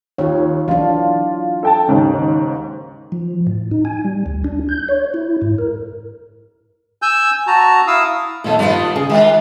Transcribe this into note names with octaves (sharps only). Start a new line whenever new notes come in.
D#2 F4 C#5
E3 F#3 D4 F4
A4 G5 A5
D#2 G#2 C#3
F3
A2
D#4
G#5
G3
D2
D4
G6
C#5
E4
G#2
A#4
G#5 E6 G6
F#4 A5 A#5
E4 F5 D#6 E6
F2 A#2 D#3 G#3
G2 D#3 B3 F4 D5
C#3 G#4
D#3 G#3 D4 F4